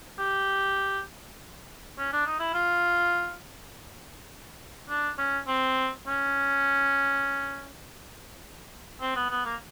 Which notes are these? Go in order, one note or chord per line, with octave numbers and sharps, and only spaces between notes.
G4
C#4
D4
D#4
E4
F4
D4
C#4
C4
C#4
C4
B3
B3
A#3